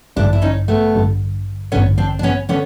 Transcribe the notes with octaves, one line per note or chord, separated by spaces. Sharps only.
A1 G2 D3 D4 E4
E4
C#4 D#4
A3 B3
A1 G2 D3
A1 G2 D3 B3 C#4
C4 D4
D4
B3 C#4
D3 B3 C#4